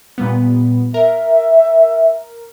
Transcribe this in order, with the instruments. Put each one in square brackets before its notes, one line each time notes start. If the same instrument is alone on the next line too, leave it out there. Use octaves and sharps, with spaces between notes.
[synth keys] A#2 G3 B3
[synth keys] A#4 [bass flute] E5